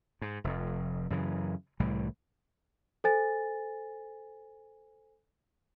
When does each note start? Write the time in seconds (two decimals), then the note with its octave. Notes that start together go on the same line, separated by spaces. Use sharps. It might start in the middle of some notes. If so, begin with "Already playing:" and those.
0.22 G#2
0.44 F1 F2
1.10 F#2 C#3 E3
1.80 C2 A2 E3 G3
3.04 A4 C5 G#5 A6